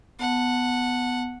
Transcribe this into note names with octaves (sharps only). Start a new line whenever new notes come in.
B3 F#5 A5